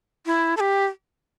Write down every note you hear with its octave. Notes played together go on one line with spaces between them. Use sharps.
E4
A4
G4